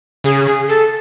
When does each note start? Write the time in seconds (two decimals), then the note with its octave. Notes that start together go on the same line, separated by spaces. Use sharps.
0.24 C#3 G#4
0.47 G#4
0.68 A4